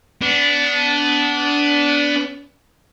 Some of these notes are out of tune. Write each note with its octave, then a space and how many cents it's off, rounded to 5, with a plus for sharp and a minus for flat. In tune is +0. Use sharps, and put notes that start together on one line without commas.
B3 +15 D4 -15